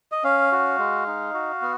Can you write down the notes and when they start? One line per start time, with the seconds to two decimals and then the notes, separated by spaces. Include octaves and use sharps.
0.12 D#5
0.24 C#4 F5
0.52 F#4
0.78 G#3
1.07 D#4
1.34 F#4
1.62 B3